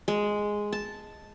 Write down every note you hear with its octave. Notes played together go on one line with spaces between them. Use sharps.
G#3
A5